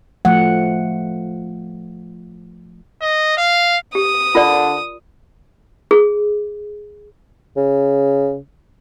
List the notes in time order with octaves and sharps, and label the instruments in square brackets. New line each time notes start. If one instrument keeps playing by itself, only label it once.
[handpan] F3 A3 F#5
[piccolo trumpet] D#5
F5
[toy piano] G4 [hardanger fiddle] D#6
[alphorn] D3 [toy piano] F4 A#4 D5
[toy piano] G#4
[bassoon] C#3